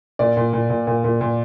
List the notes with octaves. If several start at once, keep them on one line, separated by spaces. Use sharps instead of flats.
A#2 D5
A#2
A#2
A#2
A#2
A#2
A#2